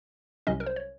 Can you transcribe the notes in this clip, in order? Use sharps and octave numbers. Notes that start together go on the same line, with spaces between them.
C2 C3 F#3 C#4 D#5
A#4
C5
C#5